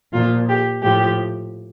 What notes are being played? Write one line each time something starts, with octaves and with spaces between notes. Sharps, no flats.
A#2 F3 F4
G4
A2 F3 G4